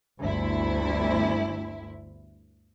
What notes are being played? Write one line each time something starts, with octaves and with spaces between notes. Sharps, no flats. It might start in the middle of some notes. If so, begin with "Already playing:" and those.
G1 D2 E4